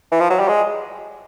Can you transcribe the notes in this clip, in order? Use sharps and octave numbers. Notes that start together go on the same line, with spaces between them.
E3
F3
F#3
G3
G#3